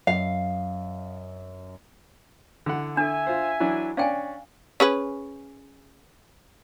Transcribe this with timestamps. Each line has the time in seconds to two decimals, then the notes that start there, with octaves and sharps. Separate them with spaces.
0.07 F#2 D#5 F5
2.66 D3 E4 F#5
2.97 D4 A4 E5 G#5
3.27 F4 C5
3.60 E3 F#3 D4
3.97 C#4 D4 D5 F5 G5 G#5
4.80 C#4 G#4 B4